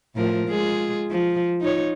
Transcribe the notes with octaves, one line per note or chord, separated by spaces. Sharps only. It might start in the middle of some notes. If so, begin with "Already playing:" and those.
A2 F3 A#4
G#3 F4 G#4
F3
D#4 F4 C#5